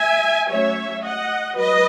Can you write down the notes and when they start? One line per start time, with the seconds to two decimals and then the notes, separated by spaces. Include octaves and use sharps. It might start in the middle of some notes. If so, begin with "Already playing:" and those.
Already playing: E5 G#5
0.50 F#3 A3 C#4 C#5 E5
1.04 D#5 F#5
1.57 F#3 B4 D#5